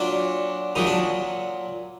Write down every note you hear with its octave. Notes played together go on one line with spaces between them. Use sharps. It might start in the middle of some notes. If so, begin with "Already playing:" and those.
Already playing: A#2 F#3 D4
A#2 F#3 D#4
D4